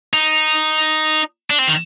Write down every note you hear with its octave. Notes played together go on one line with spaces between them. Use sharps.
D#4
D4
C4
D#3